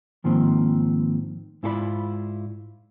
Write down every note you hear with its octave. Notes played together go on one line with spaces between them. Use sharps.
G#2 D#3 F3 A#3 C4
G#2 E4 F4 A4 D5 B5